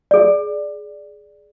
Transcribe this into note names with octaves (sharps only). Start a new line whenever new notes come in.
G#4 D5